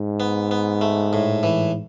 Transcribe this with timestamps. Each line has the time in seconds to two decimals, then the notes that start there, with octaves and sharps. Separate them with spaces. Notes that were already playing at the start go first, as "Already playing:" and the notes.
Already playing: G#2
0.20 B3
0.51 B3
0.81 A3
1.13 A2
1.43 E3